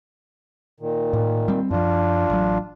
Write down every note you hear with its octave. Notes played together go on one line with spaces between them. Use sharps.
A#2 D#3
A2
G3 C4
F#2 F3 D4 F4
A1 F#3